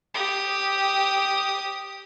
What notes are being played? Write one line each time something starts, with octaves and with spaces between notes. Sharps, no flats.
G4 D#6